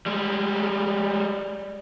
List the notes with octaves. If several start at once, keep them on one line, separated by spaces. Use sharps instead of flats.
G3 G#3